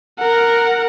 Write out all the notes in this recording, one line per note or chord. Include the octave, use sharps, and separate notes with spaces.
A#4 F#5